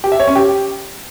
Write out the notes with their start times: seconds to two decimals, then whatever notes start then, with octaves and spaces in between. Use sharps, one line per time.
0.04 G4
0.12 E5
0.20 C#5
0.28 C#4
0.36 G4